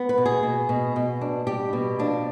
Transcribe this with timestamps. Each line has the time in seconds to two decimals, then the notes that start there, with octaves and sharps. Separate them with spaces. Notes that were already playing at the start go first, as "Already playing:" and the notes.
Already playing: B3
0.09 B4
0.18 B2
0.26 G#4
0.43 B2
0.69 B2
0.96 B2
1.21 D4
1.47 G3 G4
1.73 B2
1.99 F3 D4